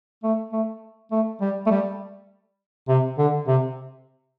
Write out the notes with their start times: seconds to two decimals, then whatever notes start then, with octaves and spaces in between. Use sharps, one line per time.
0.23 A3
0.53 A3
1.12 A3
1.41 G3
1.66 A3
1.71 G3
2.88 C3
3.18 D3
3.47 C3